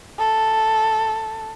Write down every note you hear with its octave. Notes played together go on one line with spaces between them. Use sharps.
A4